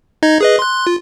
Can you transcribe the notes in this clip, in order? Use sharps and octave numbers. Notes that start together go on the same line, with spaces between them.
D#4 D#5 G#6
G#4 B4 D#5
C6 F#6
F4